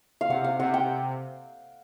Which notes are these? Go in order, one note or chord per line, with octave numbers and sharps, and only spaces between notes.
F5
C3 F#5
F5
C3 F#5
G5